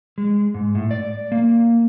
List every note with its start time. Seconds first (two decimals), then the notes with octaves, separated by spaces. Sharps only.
0.18 G#3
0.54 G#2
0.75 A2
0.91 D5
1.32 A#3